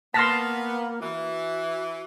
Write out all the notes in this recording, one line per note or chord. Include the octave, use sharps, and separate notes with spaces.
A#3 B3 A5 C6 F6 A#6 B6
E3 F#4